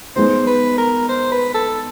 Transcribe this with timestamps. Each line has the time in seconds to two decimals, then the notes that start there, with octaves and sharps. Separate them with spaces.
0.16 G#3 B3 D#4 C5
0.47 B4
0.78 A#4
1.09 C5
1.32 B4
1.55 A4